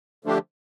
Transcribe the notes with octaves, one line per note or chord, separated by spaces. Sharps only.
D3 F3 A3 D4 G4